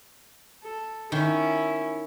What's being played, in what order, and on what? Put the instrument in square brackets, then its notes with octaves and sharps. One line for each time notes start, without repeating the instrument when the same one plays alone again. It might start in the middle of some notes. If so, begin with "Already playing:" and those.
[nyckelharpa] A4
[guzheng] D#3 [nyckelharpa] C#4 E4